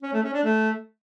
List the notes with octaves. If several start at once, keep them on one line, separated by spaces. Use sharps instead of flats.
C#4
A3
C#4
D4
A3